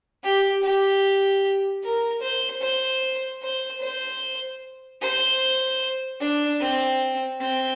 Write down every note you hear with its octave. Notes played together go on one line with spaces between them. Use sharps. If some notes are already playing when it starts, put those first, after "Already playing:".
G4
G4
A#4
C5
C5
C5
C5
C5
D4
C4
C4